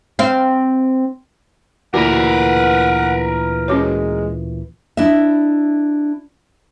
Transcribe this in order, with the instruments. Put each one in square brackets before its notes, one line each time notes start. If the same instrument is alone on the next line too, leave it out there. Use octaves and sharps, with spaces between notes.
[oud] C4 F5
[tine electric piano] D2 A#2 E3 [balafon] F#4 [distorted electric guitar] A#4 B4 [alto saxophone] F#5
[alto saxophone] G#3 [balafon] C#4 F#4 C#5
[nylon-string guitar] D4 E4 D#5 E5